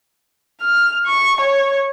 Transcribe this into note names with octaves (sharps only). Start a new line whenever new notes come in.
F6
C#6
C#5